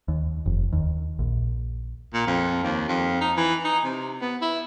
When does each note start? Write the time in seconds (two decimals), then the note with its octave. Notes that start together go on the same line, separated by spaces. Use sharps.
0.08 D#2
0.46 F1
0.73 D#2
1.19 A#1
2.14 A#2
2.27 F2
2.63 D#2
2.88 F2
3.21 D#4
3.37 E3
3.65 D#4
3.84 C3
4.22 B3
4.42 E4